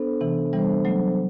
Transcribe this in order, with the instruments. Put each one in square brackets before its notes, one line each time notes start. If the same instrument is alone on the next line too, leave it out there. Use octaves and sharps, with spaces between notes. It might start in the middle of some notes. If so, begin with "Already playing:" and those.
Already playing: [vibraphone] B3 D4 A4 C5
[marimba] C3 E3
[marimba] E3 G3 [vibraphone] B3 D4 A4 C5
[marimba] F#3 A3